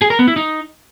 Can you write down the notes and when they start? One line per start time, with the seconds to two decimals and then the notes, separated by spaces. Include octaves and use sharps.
0.02 G#4
0.10 A#4
0.19 B3
0.28 E4
0.36 D#4